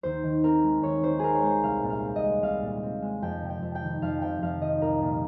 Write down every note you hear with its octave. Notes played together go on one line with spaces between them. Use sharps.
D#2 C5
D#3
C4 A#4
G#3
D#2 C#5
D#3 C5
C4 G#4 A#4
C#5
G#3 C5
C2 F5
A#2
F5
C4
D#5
G#3
C2 F5
A#2
C4
G#3
F2 G5
C3
G5
F2
G5
D#3
F2 F5
C3 G5
F2 F5
D#3 D#5
C2 A#4
A#2